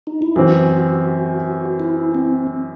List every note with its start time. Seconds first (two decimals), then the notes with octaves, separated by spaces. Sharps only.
0.07 D#4
0.22 E4
0.36 F#2 E3 C4 F#4
1.80 E4
2.15 C4